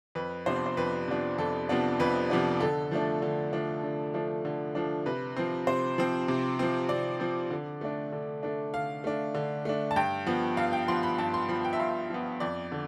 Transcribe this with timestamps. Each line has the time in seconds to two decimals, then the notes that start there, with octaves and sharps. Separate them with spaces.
0.15 F2 B4
0.46 C3 F3 B3 D4 C5
0.56 D5
0.66 C5
0.77 F2 B4
1.08 C3 F3 B3 D4
1.38 F2 A4
1.69 C3 F3 B3 D4
2.00 F2 B4
2.30 C3 F3 B3 D4
2.60 D3 A4
2.91 F3 A3 D4
3.22 D3
3.53 F3 A3 D4
3.84 D3
4.14 F3 A3 D4
4.45 D3
4.75 F3 A3 D4
5.06 C3 B4
5.36 F3 C4
5.67 C3 C5
5.98 F3 C4
6.28 C3
6.59 F3 C4
6.89 C3 D5
7.20 F3 C4
7.50 D3
7.81 A3 D4
8.12 D3
8.43 A3 D4
8.74 D3 F5
9.04 A3 D4
9.34 D3
9.65 A3 D4
9.91 A5
9.96 G2 G5
10.26 F3 B3
10.57 G2 F5
10.73 G5
10.88 F3 B3 C6
11.03 B5
11.18 G2 A5
11.34 C6
11.48 F3 B3 B5
11.64 G5
11.73 E5
11.79 G2 F5
12.10 F3 B3
12.40 F2 D5
12.72 D3